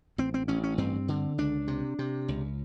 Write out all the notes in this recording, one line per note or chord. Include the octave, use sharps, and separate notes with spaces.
A1 C4
C4
A1 C#4
C#4
G2 C4
D3
C#2 D4
C3
C3
C#2